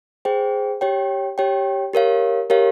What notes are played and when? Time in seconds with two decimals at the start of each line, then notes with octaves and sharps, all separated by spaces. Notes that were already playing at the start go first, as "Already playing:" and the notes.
0.25 G#4 C5 G5
0.81 G4 C#5 G5
1.38 G4 C#5 G5
1.93 G4 A#4 C#5 F5
2.50 G4 A#4 C#5 F5